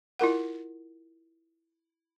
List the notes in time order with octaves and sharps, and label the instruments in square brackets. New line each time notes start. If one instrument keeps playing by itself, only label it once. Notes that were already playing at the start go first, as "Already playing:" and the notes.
[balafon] E4 F4 A#4 F#5